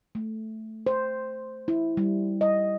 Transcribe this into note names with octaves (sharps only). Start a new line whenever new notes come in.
A3
C5
E4
G3
D#5